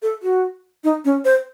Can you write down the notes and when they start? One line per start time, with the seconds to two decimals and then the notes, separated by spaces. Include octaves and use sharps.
0.02 A4
0.23 F#4
0.84 D#4
1.05 C#4
1.25 C5